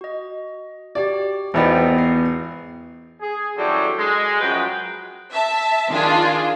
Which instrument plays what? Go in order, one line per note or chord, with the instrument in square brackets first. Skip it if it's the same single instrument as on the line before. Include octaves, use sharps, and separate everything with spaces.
[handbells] F#4 D#5
[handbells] F#4 G4 [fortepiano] D5
[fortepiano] G#1 B3 D#4 [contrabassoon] E2 [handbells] C5 D5 G5
[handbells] C7
[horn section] G#4
D3 E3 F#3 G3 C4 C#4
G#3
F#2 F3 F#3 B4 G5
[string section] E5 A5
D#3 D4 F4 G#4